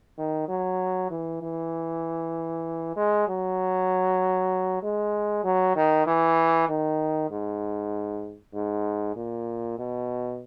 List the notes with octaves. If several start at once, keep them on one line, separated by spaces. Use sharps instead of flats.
D#3
F#3
E3
E3
G#3
F#3
G#3
F#3
D#3
E3
D#3
G#2
G#2
A#2
B2